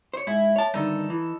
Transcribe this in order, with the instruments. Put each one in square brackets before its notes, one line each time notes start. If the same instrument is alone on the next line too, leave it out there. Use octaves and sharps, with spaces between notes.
[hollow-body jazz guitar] C5 C#5
[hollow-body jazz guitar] G#2 [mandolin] E4
[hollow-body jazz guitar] C#5 A5
[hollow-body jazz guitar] G2 D3 D#3 [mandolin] D#4 A4
[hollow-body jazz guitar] E3